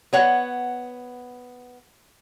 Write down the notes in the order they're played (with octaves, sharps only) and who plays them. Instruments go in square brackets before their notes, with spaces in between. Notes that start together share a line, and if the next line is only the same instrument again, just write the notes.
[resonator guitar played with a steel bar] B3 C#5 F#5